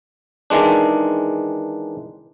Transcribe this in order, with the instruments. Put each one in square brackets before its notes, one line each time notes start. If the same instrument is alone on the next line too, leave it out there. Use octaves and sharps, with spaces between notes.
[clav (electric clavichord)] D#3 E3 G#3 D4